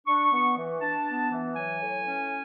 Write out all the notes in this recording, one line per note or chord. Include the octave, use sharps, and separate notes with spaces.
D4 C#6
B3
E3
D4 A5
B3
E3
F#3 G#5
A2
C#4